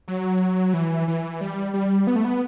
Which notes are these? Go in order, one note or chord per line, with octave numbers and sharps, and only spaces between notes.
F#3
E3
E3
G3
G3
B3
A3
B3